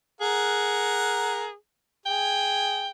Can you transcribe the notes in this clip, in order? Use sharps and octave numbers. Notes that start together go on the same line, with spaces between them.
G#4 A#4 F#5
G#4 G5